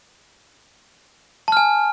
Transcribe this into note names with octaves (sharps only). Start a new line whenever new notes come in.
G#5 A5 F6